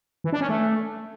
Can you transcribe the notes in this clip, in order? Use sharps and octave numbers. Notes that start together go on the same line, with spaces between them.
E3
D4
C#4
A3